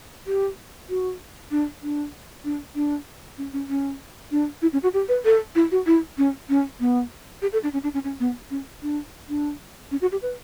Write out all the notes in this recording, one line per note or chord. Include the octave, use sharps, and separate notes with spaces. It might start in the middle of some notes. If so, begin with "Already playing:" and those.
G4
F#4
D4
D4
D4
D4
C#4
C#4
C#4
D4
E4
C#4
F#4
G4
B4
A4
E4
F#4
E4
C#4
C#4
B3
G4
A4
D4
C#4
D4
C#4
C#4
B3
C#4
D4
D4
C#4
F#4
G4
B4